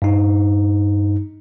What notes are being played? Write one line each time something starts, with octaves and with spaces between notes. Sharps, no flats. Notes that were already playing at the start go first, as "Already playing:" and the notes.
G2 D#4